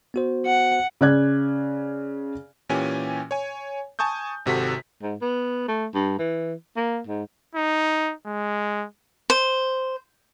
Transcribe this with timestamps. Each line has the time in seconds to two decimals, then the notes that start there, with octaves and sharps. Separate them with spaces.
0.14 B3 F#4 C5
0.46 F#5
1.01 C#3 D5 F#6 G#6
2.69 A#2 E3 C#4 G4 G#5
3.31 C#5 G#5
3.99 G#5 A5 C#6 D#6 G6
4.46 G#1 C3 F#4 A4 B6
5.02 G#2
5.22 B3
5.68 A3
5.94 G2
6.19 E3
6.76 A#3
7.07 G#2
7.55 D#4
8.26 G#3
9.30 C5